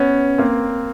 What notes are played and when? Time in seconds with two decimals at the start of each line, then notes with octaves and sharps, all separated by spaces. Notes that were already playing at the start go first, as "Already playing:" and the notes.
Already playing: B3 C#4
0.38 A#3 C4